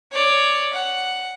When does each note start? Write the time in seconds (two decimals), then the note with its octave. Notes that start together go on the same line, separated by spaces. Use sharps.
0.12 C#5 D5
0.73 F#5